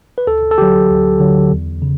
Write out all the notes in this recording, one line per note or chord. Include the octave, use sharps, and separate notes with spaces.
B4
D2 A4
A4
D3 F#3 G4
D2
D3 F#3
E2
C#3